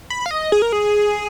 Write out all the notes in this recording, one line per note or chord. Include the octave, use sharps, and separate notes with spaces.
B5
F5
D#5
G#4
A#4
G#4